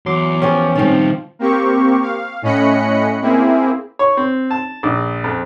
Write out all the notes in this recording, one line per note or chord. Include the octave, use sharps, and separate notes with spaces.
E2 F#3 C6 D6
F3 B3 C#4 G4
D#3 F3 G3 C4
A#3 C4 G4 C#6
F5
A2 C#4 D#5 B5 F#6 C#7
A#3 C4 E4 G#4
C#5
C4
A5
A#1
F2